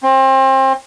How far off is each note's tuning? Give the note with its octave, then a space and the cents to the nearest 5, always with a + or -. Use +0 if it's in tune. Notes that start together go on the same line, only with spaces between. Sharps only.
C4 +30